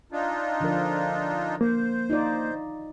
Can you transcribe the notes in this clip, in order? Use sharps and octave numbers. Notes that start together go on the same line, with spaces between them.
D4 D#4 F4
D3 F3 A#4
A#3 C5
D#4 F4 D5